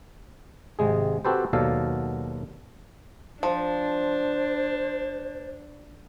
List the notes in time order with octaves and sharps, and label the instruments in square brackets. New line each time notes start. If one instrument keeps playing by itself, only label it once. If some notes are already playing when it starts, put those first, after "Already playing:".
[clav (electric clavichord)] G#1 C3 G#3 G#4
C4 F#4 G4 A4 B4 C5
D#2 B2 F#3 A4 D5 F5
[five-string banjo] F3 [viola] D4 [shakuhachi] C5